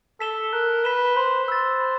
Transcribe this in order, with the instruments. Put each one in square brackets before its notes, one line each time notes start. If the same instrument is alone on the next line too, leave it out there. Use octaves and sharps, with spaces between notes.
[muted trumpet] A4 [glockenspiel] B6 E7 G7
[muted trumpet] A#4 [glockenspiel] F#6
[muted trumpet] B4 [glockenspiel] B6 E7 G7
[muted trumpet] C5 [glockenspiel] B5
[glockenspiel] E6 A6
B5